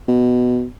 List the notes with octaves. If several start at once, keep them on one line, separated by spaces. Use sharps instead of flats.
B2